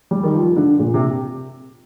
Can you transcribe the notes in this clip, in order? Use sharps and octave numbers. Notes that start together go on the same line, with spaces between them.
G3
D#3
F3
D3
A#2
C3